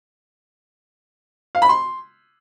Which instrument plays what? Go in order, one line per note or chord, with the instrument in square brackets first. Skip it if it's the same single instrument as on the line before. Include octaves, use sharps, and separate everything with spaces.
[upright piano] F5
B5
C6